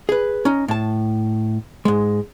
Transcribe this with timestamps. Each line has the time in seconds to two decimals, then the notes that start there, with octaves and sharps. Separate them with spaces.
0.09 G#4 B4
0.45 C#4 D#4
0.68 A2 A5
1.85 G#2 G#3